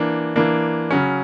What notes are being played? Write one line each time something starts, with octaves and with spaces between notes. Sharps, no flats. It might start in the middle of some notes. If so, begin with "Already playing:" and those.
Already playing: E3 A#3 D4
E3 A#3 D4
C#3 F#3 C#4